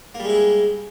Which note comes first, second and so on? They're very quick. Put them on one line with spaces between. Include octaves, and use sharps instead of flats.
A#3 G3 G#3 E4 G#4